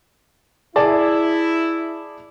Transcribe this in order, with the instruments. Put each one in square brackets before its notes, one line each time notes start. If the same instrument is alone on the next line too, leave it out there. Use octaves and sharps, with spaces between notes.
[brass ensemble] E4 [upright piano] G#4 D5 A5